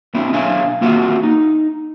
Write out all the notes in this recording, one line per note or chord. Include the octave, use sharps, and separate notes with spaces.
C4 D4 E4
B1 D4 C#5 E5 F5 G#5
A#3 C4 F4 F#4 E5 F#5
D#4